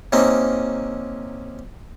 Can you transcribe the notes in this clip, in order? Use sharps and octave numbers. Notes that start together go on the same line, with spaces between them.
C3 A#3 C4 C#4 D#4